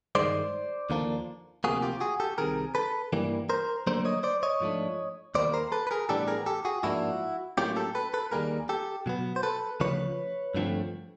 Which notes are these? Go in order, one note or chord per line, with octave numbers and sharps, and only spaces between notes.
G2 D#3 G#3 C5 D5
D#2 D3 F3 A#3 D4
D2 C3 F3 A#3 F#4 G#4
F4 G4
F#4 G#4
G4 A4
C2 C3 D#3 G#4 A#4
A4 B4
G2 E3 G3 A#3
A#4 C5
D2 D3 F#3 A#3 A#4 C5
C#5 D#5
C5 D5
C#5 D#5
G#2 F3 A3 D4
D#2 D#3 G3 A#3 C5 D5
A#4 C5
A4 B4
B4
G#4 A#4
A2 E3 G3 B3 D4 G4 A4
G#4 A#4
G4 A4
F#4 G#4
G#2 F3 A#3 D4 E4 F#4
A2 F#3 A#3 C#4 F4 G4
G4 A4
A4 B4
A4 B4
D#2 D#3 G3 A#3 G#4 A#4
G4 A4
B2 F#3 B3
C5
A4 B4
D2 C#3 F3 B4 C#5
G2 D3 F3 A3 C4